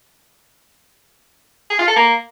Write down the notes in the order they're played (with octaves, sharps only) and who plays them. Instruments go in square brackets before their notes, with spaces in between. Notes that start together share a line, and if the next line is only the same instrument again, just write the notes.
[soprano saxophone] G#4
F4
A4
A#3